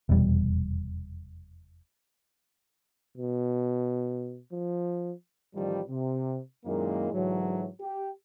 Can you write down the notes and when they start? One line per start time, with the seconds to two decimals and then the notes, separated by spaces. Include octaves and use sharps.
0.09 F1 E2 B2 G3
3.18 B2
4.52 F3
5.56 A1 D#3 F3 G3
5.90 C3
6.65 F#2 A#2 D#3 G#3 A#3 E4
7.13 G#2 D3 E3 F#3
7.81 G4